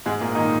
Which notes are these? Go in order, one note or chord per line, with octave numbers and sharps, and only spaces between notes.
G#2 G#3
A#2 A#3
D#3 D#4